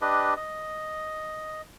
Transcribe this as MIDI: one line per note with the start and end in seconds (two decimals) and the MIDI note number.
0.01 0.34 62
0.01 0.34 67
0.01 0.34 71
0.01 0.34 75
0.37 1.62 75